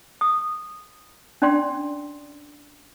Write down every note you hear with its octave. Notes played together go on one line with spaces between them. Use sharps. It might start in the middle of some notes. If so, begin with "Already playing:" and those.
D#6
C#4 D4 D5 G5 C6